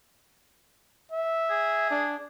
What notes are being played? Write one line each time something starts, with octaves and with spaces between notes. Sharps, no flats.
E5
G#4
D4